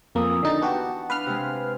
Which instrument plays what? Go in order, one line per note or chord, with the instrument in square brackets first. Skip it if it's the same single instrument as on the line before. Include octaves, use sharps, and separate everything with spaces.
[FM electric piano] F2 A#3 [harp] E3 D#6
[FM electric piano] D3 D#4 A6
[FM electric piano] B3 F#4 G4 [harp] F#5 A5
[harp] D4 [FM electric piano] B4 F5 F6
[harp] C3 G#3